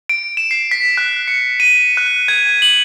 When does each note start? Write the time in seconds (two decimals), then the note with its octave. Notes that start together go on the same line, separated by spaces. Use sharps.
0.09 D7
0.37 E7
0.51 C7
0.71 B6
0.97 F#6
1.28 C#7
1.60 D#7
1.97 F#6
2.28 G#6
2.62 F#7